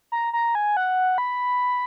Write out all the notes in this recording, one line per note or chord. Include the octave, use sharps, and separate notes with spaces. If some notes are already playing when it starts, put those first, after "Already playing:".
A#5
A#5
G#5
F#5
B5